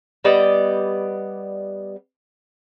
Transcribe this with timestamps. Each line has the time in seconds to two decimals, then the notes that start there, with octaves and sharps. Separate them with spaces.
0.24 G3 B3 D5 D#5